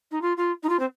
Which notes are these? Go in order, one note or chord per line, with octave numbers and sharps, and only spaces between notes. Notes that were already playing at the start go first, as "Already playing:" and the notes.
D#4
F4
F4
D#4
F4
C4